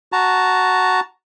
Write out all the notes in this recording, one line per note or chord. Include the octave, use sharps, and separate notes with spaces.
F#4 A5 A#5